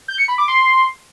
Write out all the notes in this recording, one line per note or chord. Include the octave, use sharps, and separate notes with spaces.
G6
C#7
B5
D6
C6